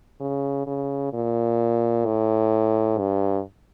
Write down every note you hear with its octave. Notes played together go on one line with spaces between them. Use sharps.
C#3
C#3
A#2
A2
G2